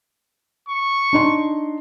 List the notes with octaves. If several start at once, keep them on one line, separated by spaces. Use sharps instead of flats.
C#6
D4 D#4 C6